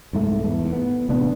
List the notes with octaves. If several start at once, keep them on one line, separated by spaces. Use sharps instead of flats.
C2 G#2 A3
E2
B3
A1 C3 B3 D4